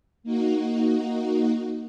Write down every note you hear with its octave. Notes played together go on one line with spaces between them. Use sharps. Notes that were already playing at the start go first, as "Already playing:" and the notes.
A#3 D#4 F#4